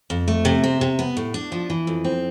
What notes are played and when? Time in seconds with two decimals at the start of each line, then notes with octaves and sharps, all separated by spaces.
0.10 F2
0.28 A3
0.45 C3
0.64 C4
0.81 C3
0.99 B3
1.17 A2
1.34 D4
1.52 F3
1.70 E3
1.87 F2
2.04 C4